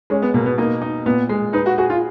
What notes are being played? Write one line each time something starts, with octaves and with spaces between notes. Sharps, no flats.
G#3 C#4
B3
B2 A#3
B3
A#3 D#4
D#4
A#2 B3
G#3
D#4 B4
F#4
F#4 G#4
F4